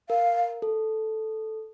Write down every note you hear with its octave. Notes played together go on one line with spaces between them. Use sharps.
A#4 F5
A4